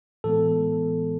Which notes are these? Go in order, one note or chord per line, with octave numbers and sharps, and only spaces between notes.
A2 E3 G#3 B3 A4